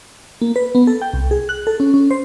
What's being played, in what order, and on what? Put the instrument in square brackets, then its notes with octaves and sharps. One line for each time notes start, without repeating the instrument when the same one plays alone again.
[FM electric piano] A#3
B4
B3
A4
G5
C2
G#4
F#6
A4
C#4
C#4
C5